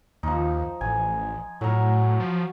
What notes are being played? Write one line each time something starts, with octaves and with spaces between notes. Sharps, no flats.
D#2 F3 D#4
A1 G#5
A2 F#3 A#4
F3